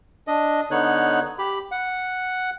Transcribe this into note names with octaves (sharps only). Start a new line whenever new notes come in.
D4 D#5
D3 B3 D#4 C#5 F#6
G4 B5
F#5